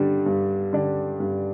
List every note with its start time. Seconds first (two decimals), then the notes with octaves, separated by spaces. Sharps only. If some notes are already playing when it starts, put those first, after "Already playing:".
Already playing: G2 D3 G3 D4
0.26 G2
0.73 D3 G3 D4
1.20 G2